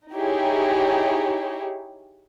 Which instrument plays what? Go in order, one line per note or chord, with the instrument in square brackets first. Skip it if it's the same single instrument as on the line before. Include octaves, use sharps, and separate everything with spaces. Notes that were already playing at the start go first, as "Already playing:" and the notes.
[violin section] D#4 E4 G4 G#4 C#5